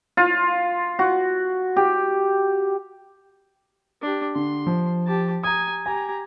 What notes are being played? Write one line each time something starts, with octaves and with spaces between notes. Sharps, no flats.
F4
F#4
G4
D4 G4
D3 C6
F3
G4 A5
G#5 A#5 D#6
G4 G#5 A#5